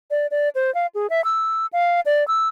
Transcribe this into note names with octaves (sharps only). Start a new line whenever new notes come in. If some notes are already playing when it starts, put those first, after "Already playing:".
D5
D5
C5
F5
G#4
E5
E6
F5
D5
E6